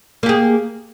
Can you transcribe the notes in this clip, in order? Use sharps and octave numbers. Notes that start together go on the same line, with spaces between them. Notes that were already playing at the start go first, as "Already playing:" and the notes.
A#3 G4 G#4